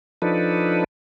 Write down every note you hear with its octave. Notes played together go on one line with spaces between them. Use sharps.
F3 D4 D#4 A4 B4